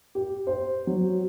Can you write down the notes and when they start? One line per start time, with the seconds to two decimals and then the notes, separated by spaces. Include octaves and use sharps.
0.15 G4
0.47 C5
0.87 F#3